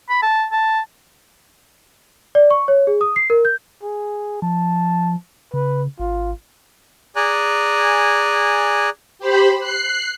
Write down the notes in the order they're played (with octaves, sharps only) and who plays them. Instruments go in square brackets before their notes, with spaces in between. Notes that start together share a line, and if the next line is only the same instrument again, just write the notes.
[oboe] B5
A5
A5
[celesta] D5
C#6
C#5
G#4
D#6
C7
A#4
G6
[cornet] G#4
[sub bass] F3 [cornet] A5
[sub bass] C#3 [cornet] B4
[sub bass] G#1 [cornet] F4
[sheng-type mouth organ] G#4 D5 G#5 A#5 F#6
[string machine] G4 C5 B5
F#6 C7